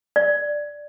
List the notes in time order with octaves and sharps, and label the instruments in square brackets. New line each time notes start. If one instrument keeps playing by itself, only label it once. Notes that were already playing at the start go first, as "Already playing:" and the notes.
[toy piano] D5